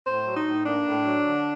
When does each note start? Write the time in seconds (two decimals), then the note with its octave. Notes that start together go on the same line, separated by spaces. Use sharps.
0.07 A2 C5
0.27 F#3
0.36 D#4
0.46 A2
0.66 A#3 D4
0.86 A2
1.05 F#3
1.26 D3